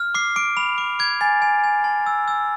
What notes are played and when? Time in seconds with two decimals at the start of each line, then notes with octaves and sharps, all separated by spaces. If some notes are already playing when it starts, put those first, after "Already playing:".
Already playing: F6
0.15 D6 C7
0.36 D6 D7
0.57 B5 F7
0.78 D6
0.99 D6 G#6
1.21 G#5 A6
1.42 G#5
1.64 G#5
1.84 A5
2.06 E6
2.28 E6